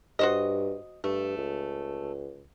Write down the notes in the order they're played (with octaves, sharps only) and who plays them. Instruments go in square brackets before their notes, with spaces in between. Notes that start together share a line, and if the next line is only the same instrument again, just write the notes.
[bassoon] G2 [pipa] F#4 C5 D#5
[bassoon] G2 [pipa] A3
[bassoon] C#2